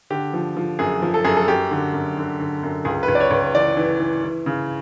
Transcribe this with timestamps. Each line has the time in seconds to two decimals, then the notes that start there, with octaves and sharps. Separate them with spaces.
0.10 D3 G4
0.33 F3
0.57 F3
0.79 F#2 G#4
1.02 F3
1.14 A4
1.24 F#2 G#4
1.37 A4
1.48 F#2 G4
1.71 D3
1.94 F#2
2.17 D3
2.40 D3
2.63 F#2
2.85 C#2 G#4
3.03 B4
3.08 C#2
3.15 D5
3.20 C#5
3.31 C#2
3.54 E3 D5
3.77 E3
4.00 E3
4.23 E3
4.46 C#3